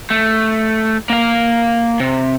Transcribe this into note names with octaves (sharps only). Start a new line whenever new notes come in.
A3
A#3 F5
C3